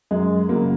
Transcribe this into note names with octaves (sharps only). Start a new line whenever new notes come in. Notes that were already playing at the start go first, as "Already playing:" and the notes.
F#2 G#3
C#3 F#3 A#3